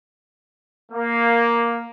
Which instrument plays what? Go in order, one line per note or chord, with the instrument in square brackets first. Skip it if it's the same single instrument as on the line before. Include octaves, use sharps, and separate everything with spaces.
[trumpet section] A#3